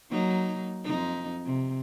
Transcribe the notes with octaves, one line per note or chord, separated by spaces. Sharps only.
F#3 A#3 D#4
F2 D#4
C3